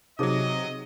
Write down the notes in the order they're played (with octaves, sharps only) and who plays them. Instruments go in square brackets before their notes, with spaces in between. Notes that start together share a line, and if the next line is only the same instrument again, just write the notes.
[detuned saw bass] C3 [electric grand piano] F#3 D#6 [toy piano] D#4 G#4 C5 [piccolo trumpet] D#5